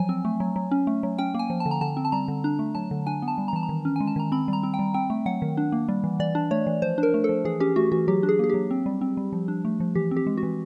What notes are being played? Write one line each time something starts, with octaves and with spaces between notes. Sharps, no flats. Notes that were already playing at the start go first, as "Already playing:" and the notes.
Already playing: F3 F#3 G#5
C4
A3
F#3
F#3
C#4
A3
F#3
C#4 G5
A#3 G#5
F3
A5
D3
A#5
D3 A5
C4
A5
G3 A#5
D3
D4 A#5
A3
F#3 A5
D3
D4 G#5
B3
A5
G3
A#5
E3 A5
A#5
D#3
C#4
G#3 G#5
A5
D#3 A#5
C4 B5
G3
A#5
C4
G5
G3
C4 G5
A3
F#3 F#5
D#3
D4
A#3
G3
E3
E3 D5
D4
A3 C#5
E3
F3 C5
D4
A#4
A3
A4
F3
E3 G#4
C#4 G4
A3 F#4
E3 F#4
F#3 G4
D4
G#4
A#3 G#4
F#3 G4
C4
G3
C4
G3
F3
D4
A3
F3
E3 G4
C4
G4
G#3
F#4
E3